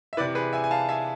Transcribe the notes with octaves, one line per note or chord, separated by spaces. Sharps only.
E5
C3 E3 B4 D5
G#4 B4
E5 G#5
G#5
F5 A5
E5 G#5